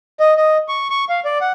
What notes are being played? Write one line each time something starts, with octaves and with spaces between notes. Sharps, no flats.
D#5
D#5
C#6
C#6
F5
D5
F#5